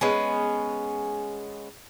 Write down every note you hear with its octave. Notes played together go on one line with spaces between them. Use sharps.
G#3 B3 C#4